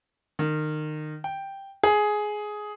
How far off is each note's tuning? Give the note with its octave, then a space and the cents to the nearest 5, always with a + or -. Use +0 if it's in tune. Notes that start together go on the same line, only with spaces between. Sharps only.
D#3 -25
G5 +0
G#4 +10